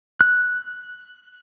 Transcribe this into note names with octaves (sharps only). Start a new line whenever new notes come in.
F#6